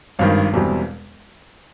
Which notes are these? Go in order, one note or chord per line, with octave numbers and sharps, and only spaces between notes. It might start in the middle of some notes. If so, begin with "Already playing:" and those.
G#1 G2 D#3 F5
E1 E2 B2 G3 C4